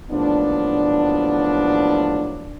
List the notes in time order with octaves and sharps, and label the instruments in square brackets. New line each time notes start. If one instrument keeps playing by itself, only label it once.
[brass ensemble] D#2 A2 F3 F#3 B3 D4